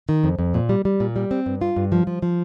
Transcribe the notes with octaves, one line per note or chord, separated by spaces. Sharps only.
D#3
F2
F2
A#2
G3
G3
A#2
G3
C4
G2
F4
G2
F3
F3
F3